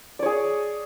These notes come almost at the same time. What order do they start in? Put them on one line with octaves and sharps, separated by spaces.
D5 C#5 G#4